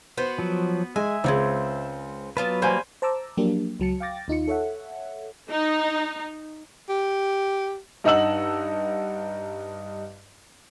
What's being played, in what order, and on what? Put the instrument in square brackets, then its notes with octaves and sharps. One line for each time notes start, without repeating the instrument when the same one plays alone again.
[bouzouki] B3 F#4 [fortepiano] C5
[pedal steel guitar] F3 F#3
[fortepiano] G#3 [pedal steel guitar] E5 [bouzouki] G#5
[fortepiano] C#2 [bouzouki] G#3 A#3 C4
[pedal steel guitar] F#3 B4 [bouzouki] B3 F4 A5
[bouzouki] G3 A#3 [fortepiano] C5 G#5 B5
[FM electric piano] C5 A5 A#5 D6 E6
F3 F#3 A#3 D4 G4
C#2 F#3 A5 C#7
F5 G5 D6 A6 A#6
D#2 D#4 F4 C#7
A4 C#5 E5 F#5
[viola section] D#4
[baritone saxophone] G4
[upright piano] G2 D#4 D#5 F#5 E6 F#7